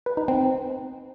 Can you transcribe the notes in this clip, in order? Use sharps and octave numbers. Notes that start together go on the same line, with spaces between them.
B4
D#4
C4